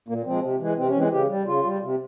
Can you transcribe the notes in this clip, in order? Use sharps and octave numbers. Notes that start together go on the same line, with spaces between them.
A#2 A#3
F3 G#3 C4
C3
E3 G#3
C3 C4
C#4
E3 G#3 C4
C#3 G4
G3
C#3 F4
G3
C3